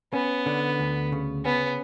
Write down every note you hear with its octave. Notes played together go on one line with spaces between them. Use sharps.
B3 C#4
D3
D2
C#3
B3 C#4